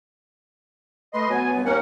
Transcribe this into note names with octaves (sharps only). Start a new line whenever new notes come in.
A3 B4 D#5 C6
B2 F#3 B3 G#5
G2
D#2 A#3 C#4 A#4 F#5